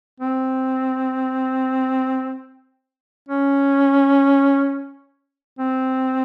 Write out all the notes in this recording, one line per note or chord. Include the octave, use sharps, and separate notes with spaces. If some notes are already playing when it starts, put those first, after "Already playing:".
C4
C#4
C4